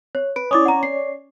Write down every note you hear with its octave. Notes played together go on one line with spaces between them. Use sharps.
C#5
B4 D7
C#4 E4 C#5 D5 D6 D#6
F#5 A#5
C7